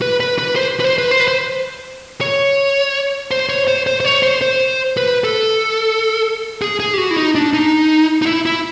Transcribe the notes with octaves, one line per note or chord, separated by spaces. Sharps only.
B4
B4
B4
C5
B4
C5
B4
C5
B4
C5
C#5
C5
C#5
C5
C5
C5
C#5
C5
C5
B4
A4
G#4
G#4
G4
F#4
E4
D#4
D4
D#4
D#4
E4
E4